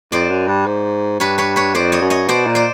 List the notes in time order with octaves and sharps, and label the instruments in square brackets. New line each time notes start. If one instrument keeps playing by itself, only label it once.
[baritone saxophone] F2 [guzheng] C5 D5
[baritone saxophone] F#2
G2
G#2
[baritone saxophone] G2 [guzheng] B4 C#5
[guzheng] B4 C#5
B4 C#5
[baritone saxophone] F2 [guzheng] C5 D5
[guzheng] C#5 D#5
[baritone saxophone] F#2
[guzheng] C#5 D#5
[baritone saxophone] B2 [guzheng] C5 D5
[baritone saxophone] A#2
[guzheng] C5 D5